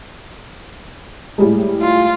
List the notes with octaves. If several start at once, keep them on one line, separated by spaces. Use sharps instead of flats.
A2 G3 G#3
F4